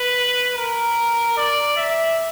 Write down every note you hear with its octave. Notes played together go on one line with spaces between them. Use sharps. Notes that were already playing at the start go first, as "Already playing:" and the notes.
Already playing: B4
A#4
D5
E5